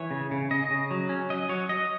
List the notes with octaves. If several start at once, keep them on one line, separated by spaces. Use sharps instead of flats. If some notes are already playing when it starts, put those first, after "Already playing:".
Already playing: E3 C#5
C#3
C#3
C#3 D#5
C#3
F#3
C#4
F#3 D#5
F#3 C#5
F#3 D#5